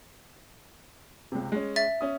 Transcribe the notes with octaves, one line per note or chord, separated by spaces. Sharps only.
C#2 C3
G#3 C#4
E5 A6
C#4 D#6